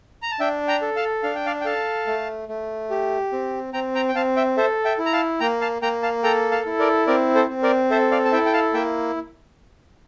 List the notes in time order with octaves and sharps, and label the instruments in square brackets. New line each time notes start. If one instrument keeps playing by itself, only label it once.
[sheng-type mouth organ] A#5
A5
D4 E5 G5
G5 A#5
A4
F5 A5
D4 F5
G5
D5 F5
G5
A4 F5 A5
A3
A3
G4
C4
C4 G5 A#5
G5 A#5
G5
C4 F5 A5
E5 G5
A4 C5 E5
E5 G5
E4
A#5
F5 A5
A#3 G5 A#5
F5 A5
A#3 G5 A#5
F5 A5
A4 G5 A#5
F5 A5
E4
A#4 D5
C4 A#4 D5
A4 C5
C4
A#4 D5
A4 C5 E5
D5 F5
A5
E4 E5 G5
G5
F5 A5
A#3 E5 G5